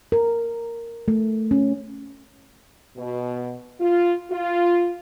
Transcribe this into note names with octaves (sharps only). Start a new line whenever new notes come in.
A#4
A3
C#4
B2
F4
F4